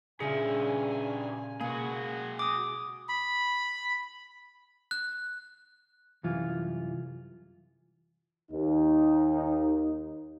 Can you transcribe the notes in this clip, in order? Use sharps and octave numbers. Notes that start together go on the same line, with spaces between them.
G2 A#2 C#3 C#4 F4 G#4 E5 G#5
B2 G#3 A#3 F#4 G#4
D6 D#6
B5
F#6
C2 F#2 E3 F4
D#2 D#4